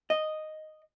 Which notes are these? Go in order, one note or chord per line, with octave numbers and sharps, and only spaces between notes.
D#5